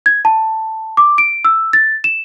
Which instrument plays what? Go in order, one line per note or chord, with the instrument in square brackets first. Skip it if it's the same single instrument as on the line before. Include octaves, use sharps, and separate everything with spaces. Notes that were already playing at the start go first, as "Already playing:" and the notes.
[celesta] G#6
A5
D6
D7
E6
A6
E7